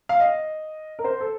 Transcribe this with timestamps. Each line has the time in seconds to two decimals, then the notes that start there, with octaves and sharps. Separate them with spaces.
0.09 F5
0.20 D#5
0.99 A#4
1.04 C5
1.21 A4